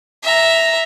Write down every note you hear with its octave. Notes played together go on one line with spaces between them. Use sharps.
E5 A#5